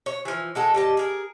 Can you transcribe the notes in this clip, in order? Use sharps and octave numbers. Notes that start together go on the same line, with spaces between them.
C#5
E3 F3
G#3 F#4 A4
G3 D#5 A5
G#4 A#4